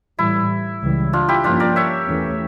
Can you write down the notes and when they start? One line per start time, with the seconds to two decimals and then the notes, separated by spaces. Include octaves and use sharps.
0.19 A2 E3 G3 E4
0.82 C#2 C#3 E3 G3
1.13 D4 F4
1.28 E4 G4
1.44 G2 F3 A#3 C#4 D4 F4
1.60 A#4 D5
1.76 C#5 E5
2.08 E2 E3 A3 C#4